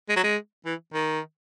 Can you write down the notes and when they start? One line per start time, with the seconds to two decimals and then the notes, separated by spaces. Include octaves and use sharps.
0.09 G#3
0.16 F#3
0.23 G#3
0.66 E3
0.94 D#3